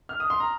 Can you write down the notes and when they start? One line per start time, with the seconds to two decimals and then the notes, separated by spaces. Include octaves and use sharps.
0.09 F6
0.20 D#6
0.30 C6
0.40 A#5